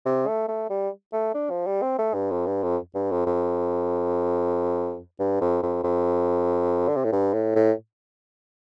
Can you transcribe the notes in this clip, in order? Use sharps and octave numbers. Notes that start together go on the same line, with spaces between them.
C3
A3
A3
G3
A3
D4
F3
G3
C4
A3
G2
F2
G2
F2
G2
F2
F2
G2
F2
F2
F2
D3
C3
A2
G2
A2
A2